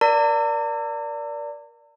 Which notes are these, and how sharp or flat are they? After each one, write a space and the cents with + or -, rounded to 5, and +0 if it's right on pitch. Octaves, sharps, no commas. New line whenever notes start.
A#4 +35 D5 -10 A#5 -45